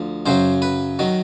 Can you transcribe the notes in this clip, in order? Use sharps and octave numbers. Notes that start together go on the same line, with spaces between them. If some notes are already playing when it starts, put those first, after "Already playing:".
Already playing: D2 F3
F#2 C#3 F#3 C5
B4
D#3 F#3